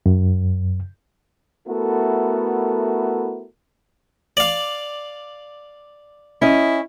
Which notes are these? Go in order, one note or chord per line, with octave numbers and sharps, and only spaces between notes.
F#2
A3 B3 E4 F#4 A4 A#4
D5 F5
C#4 E4 D#5